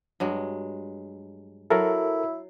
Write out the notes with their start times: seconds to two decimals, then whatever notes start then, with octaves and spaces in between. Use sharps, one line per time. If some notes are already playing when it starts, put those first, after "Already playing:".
0.20 G2 F#3 G#3
1.70 F#3 E4 A4 A#4 C#5